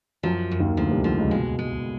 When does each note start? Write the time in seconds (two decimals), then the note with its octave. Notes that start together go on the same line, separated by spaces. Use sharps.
0.23 F#2 F3 F#3
0.51 F#2
0.60 D#2 D#3
0.77 D2 D3 F3
0.91 C2 C3
1.04 D2 D3 F3
1.19 C#2 C#3
1.31 B2 G#3
1.59 G#3